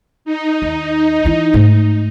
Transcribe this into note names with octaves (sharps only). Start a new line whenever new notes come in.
D#4
D#2
E3 E4
G#2 A3